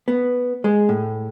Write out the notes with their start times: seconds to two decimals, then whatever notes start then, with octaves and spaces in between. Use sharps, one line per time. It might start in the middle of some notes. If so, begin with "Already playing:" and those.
0.08 B3
0.64 G#3
0.89 A2